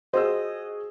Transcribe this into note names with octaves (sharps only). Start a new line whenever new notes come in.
F#4 G#4 C5 D#5 E6